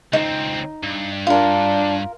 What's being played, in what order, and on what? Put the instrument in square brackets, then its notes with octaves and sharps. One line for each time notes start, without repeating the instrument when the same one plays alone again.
[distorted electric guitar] C#2 C4 [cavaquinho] D#4
[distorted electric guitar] G2
[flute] D4 [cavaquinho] F4 A#4